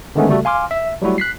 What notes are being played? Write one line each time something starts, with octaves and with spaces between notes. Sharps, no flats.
D3 D#3 G#3 A3 B3 C#4
C#3 G3 A3 F#4 A4
F5 G#5 C6 D6 F6
E5
F#3 G3 A3 E4 F#4
F#6 B6 C7